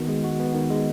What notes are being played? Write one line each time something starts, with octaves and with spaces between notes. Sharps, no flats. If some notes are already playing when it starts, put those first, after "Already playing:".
Already playing: D#3 B3 F#4
G#3
F#4
B3
D#3
G#3